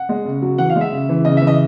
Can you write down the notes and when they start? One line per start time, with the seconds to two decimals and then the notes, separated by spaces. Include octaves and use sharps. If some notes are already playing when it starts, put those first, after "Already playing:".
Already playing: F#5
0.09 G#3
0.25 C#3
0.42 F#3
0.58 E3 F#5
0.70 F5
0.76 G#3
0.81 E5
0.92 C#3
1.09 E3
1.25 C#3 D#5
1.37 E5
1.42 E3
1.47 D#5